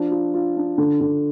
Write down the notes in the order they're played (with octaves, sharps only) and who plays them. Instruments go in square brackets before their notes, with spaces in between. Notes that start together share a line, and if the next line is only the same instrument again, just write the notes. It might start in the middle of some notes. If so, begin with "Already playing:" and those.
Already playing: [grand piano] F3 D4
F4
F4
D4
D3
D3